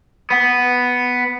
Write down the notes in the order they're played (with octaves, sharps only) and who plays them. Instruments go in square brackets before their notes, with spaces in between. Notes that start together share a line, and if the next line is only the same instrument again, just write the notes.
[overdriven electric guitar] B3